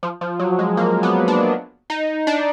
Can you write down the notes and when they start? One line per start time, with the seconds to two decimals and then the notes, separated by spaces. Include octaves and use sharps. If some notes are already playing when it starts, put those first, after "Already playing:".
0.03 F3
0.21 F3
0.40 F#3
0.59 G#3
0.77 A#3
1.03 B3
1.28 D4
1.90 D#4
2.27 D4